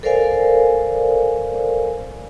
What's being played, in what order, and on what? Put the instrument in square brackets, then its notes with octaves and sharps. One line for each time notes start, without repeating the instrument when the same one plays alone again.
[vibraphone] A4 A#4 C5 D5 F5 G#5